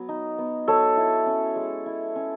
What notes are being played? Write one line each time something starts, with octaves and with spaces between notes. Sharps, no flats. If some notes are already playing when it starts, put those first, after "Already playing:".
Already playing: F#3 B3
D#4
B3
F#3 A4 C#5
E4
C#4
G#3
E4
C#4